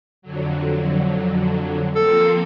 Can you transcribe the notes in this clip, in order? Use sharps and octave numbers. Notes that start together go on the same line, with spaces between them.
F2 D3 F#3
F3 A#3 C4 A4